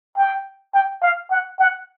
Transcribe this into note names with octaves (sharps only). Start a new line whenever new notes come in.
G5
G5
F5
F#5
F#5